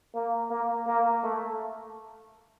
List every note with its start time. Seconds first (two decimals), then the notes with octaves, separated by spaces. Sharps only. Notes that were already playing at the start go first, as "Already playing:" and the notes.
0.15 A#3
0.51 A#3
0.87 A#3
1.23 A3